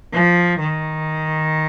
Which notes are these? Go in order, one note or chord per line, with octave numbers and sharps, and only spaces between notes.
F3
D#3